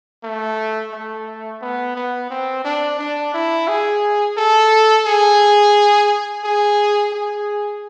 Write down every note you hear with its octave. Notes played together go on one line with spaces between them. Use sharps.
A3
A3
B3
B3
C4
D4
D4
E4
G#4
A4
G#4
G#4
G#4